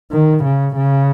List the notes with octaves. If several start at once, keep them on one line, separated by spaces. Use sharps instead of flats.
D#3
C#3
C#3